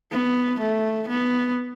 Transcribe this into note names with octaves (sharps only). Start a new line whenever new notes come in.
B3
A3
B3